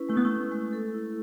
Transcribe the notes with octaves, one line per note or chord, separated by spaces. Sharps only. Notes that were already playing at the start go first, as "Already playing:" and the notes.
Already playing: C#4 E4 B4
G#3 A3
B3
A3
C#4
G#3
A4
E4